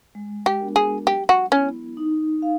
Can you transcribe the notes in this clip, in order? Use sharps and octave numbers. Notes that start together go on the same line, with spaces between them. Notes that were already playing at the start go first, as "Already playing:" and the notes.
G#3
G4
B3 D4 F#4 A#4
G#4
F#3 G4
F#4
B3 C#4 E4
D#4
F5